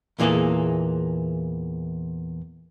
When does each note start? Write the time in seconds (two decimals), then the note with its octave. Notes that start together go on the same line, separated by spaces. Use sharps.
0.19 E2 A#2 E3 A#3 G#4 A4